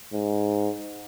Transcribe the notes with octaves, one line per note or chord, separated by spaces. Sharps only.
G#2